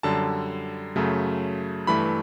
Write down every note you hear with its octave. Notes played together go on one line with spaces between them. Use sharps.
F#2 D3 G3 A5
F#2 C#3 F#3 A3
G2 E3 A3 B5